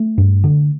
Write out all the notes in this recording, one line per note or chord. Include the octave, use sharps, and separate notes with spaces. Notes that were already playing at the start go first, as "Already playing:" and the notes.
Already playing: A3
G2
D3